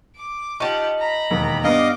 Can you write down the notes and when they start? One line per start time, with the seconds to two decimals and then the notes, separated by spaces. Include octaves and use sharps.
0.15 D6
0.60 D#4 F4 G4 F#5 A5 C#6
0.99 A#5 B5
1.30 E1 D#2
1.64 G2 B3 D#5 F5 D6